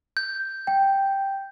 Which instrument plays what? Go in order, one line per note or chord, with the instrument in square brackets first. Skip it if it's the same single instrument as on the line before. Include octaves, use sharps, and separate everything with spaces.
[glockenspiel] G6
[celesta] G5